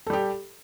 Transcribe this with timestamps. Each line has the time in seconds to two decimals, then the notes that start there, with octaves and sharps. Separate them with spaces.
0.07 A4
0.10 G3
0.13 G4